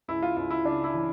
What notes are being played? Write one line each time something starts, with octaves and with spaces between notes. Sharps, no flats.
C#2 E4
F4
C#2 F4
E4
C#3 D4
E4
E3